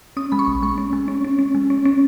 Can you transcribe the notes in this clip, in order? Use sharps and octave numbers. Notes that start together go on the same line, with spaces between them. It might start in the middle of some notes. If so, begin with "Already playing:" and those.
C#4 D#6
G#3 B5
C#6
A#1
G#3 C#6
C#4
G#3
C#4
C#4
C#4
G#3
C#4
C#4